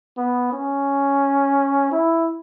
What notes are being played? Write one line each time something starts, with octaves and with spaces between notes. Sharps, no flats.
B3
C#4
E4